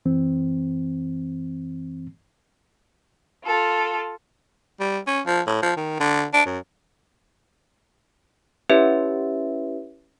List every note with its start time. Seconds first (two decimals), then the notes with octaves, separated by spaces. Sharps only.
0.05 F#2 E3 C4
3.44 F4 A4
4.80 G3
5.07 C#4
5.26 F3
5.47 A2
5.62 F3
5.77 D#3
6.00 D3
6.33 D4
6.45 F#2
8.70 C#4 E4 G4 B4 C#5 E5